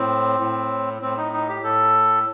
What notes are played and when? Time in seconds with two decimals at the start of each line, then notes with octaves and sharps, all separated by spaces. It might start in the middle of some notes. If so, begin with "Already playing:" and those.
Already playing: A2 C4
0.40 A2
1.02 A2 C4
1.17 D#4
1.33 D#4
1.48 G4
1.63 A2 A4